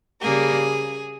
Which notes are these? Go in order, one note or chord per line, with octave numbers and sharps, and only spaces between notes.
C#3 G3 A#3 G#4